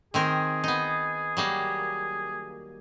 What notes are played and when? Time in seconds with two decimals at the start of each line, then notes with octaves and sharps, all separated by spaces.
0.14 D#3 C4 G#4 A#4
0.64 B3 D#4
1.37 F#3 G3 A#3